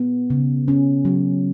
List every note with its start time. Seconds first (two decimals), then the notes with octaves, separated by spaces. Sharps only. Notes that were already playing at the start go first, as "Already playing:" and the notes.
Already playing: B3
0.30 C#3
0.68 C#4
1.05 F#3